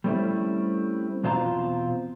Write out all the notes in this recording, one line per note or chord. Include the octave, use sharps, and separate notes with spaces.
G3 A3 C4 C#4 E4
E2 B2 C4 F4 A5 A#5